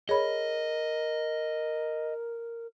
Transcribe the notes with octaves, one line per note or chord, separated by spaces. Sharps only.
G#4 A#4 C#5 D#5 B5